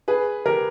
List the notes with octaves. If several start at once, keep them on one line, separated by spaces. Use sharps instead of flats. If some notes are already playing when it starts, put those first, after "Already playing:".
G#4 B4
G4 A#4